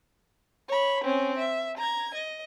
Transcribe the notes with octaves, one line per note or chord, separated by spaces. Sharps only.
C#5 B5
C4 C#4
E5
A#5 G#6
D#5